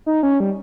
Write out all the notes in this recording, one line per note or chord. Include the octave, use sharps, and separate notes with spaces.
D#4
C#4
G3